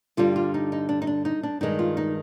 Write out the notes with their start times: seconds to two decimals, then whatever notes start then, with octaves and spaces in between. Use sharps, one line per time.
0.17 G2 D3 G3 F4
0.36 F4
0.54 D#4
0.72 D#4
0.89 D4
1.02 D#4
1.07 D4
1.25 D#4
1.43 D4
1.61 G2 D#3 G#3 D#4
1.79 F4
1.97 D#4